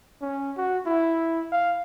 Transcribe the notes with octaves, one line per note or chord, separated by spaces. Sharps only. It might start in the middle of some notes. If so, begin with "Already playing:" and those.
C#4
F#4
E4
F5